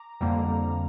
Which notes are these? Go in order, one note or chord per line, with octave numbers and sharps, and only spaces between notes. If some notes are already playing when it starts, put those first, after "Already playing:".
Already playing: A#5 D6
F2 D3 G3 A#3